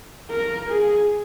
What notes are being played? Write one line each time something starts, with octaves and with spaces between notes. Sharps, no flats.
A#4
G#4